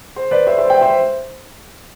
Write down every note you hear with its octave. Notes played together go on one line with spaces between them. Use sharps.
C5
B4 D5
C5 E5
C5 E5
E5 G5
C5 E5